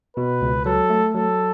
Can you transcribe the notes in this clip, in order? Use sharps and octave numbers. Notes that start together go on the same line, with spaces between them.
B2 B4
C#2
F#3 A4
A3
F#3 A4